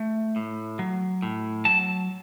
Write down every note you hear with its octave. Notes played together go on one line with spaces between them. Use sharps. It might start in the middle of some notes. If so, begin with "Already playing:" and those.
Already playing: A3
A2
F#3
A2
F#3 A5